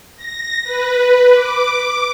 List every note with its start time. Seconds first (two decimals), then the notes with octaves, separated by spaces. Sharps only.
0.16 A#6
0.64 B4
1.34 D6